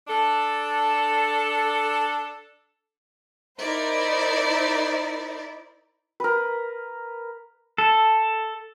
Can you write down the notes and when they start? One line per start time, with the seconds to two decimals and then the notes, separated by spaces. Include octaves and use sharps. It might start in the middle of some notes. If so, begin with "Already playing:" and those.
0.08 D4 A4
3.58 D#4 E4 A#4 C5 D5
6.20 A#4 B4
7.78 A4